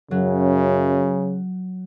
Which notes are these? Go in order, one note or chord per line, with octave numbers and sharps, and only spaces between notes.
F#2 C#3 F#3